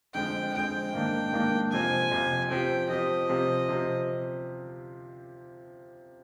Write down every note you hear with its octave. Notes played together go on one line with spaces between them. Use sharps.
F2 D3 G#3 C4 G5
F2 D3 G#3 C4 G5
G#2 D#3 A#3 D4
G#2 D#3 A#3 D4
F2 C3 F3 C4 G#5
F2 C3 F3 C4
F3 C4 G4 G5
F3 C4 G4 D#5
C3 F3 C4 G4
C3 F3 C4 G4